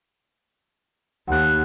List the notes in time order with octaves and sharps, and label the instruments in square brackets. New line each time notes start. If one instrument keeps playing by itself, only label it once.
[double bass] D#2 [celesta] F#5 F#6